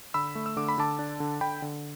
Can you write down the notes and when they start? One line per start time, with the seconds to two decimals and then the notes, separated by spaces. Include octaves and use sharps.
0.14 D3 B5 E6
0.35 A3
0.46 E6
0.57 D3 D6
0.68 B5
0.78 D3 A5 D6
0.99 D4
1.20 D3
1.41 D3 G5 B5
1.62 D3